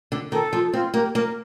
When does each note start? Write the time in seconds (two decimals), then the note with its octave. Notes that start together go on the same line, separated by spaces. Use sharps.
0.12 D3
0.32 D#3 A4
0.53 F3
0.73 C4 F4
0.94 A#3 G4
1.14 A#3 A#4